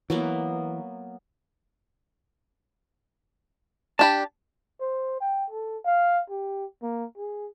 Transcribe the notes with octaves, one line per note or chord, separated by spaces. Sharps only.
E3 F#3 A#3 B3
D4 G4 A5 B5
C5
G5
A4
F5
G4
A#3
G#4